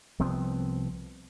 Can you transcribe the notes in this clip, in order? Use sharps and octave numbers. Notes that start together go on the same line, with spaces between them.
C2 F3 B3 C4